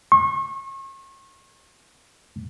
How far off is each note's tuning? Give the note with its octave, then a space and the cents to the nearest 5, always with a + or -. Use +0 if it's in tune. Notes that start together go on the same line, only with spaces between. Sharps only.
C#6 -40